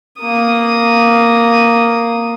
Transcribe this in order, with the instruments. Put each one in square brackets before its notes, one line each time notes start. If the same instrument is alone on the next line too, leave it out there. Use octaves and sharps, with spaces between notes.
[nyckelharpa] A#3 D#6